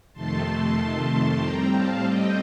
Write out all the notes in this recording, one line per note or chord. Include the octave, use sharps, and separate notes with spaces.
F2 C3 D#3 A3 A5 C6
A2 G3 C4 G5 A#5
F5 A5
D#5 G5